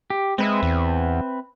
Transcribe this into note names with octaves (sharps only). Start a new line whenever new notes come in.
G4
G#3 C4 B4 E5
E2